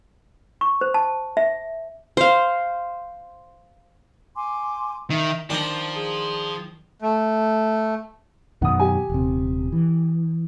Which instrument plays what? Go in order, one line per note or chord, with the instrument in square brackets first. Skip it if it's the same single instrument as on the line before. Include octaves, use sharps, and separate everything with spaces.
[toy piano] C#6
C5
A5
E5
[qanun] C5 F5
[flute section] G#5 C6 D6
[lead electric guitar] D#3 [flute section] E5
[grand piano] D#3 [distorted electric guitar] F3 [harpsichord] D4 A#5
[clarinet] G#4
[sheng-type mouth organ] A3
[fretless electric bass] F#2 B2 D#3 [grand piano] F#5 D#6
[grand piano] G4 G#5
[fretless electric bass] D#1 C3
E3